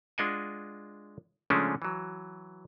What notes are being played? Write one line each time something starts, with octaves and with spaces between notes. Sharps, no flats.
G#3 D4 F4 D#5 F#5 G#5
C#3 F3 G#3 A3 C#4 D4
E3 F#3